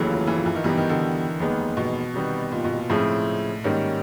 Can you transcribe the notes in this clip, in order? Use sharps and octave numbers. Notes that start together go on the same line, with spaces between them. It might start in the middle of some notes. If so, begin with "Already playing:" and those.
Already playing: F1 D#2 C#3 E3 F#3 A3
F3
E3
F3
E3
D#3
B2 E3 G3 B3 D#4 G4
D#3
D3
F1 D#2 D#3 G#3 B3
B2
C3 D#3 G3 B3
A#2
B2
A#2
A2 C#3 F3 G#3 C4 E4
G#2 D#3 G3 A#3 C#4